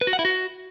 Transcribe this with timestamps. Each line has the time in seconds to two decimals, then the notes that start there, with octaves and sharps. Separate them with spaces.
0.01 B4
0.07 F#4
0.13 F#5
0.19 E4
0.25 F#4